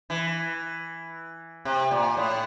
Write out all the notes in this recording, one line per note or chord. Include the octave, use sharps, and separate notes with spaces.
E3
C3
A#2
A2